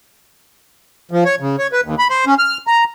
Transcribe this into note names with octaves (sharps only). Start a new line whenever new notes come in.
F3
C#5
C#3
C#5
B4
D#2
B5
C5
C#4
F6
A#5